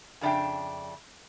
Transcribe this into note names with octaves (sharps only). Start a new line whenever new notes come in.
F2 C#3 D4 E5 G5